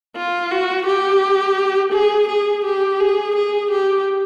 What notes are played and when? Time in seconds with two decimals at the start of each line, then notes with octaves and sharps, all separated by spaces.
0.16 F4
0.51 F#4
0.86 G4
1.93 G#4
2.28 G#4
2.65 G4
3.00 G#4
3.36 G#4
3.71 G4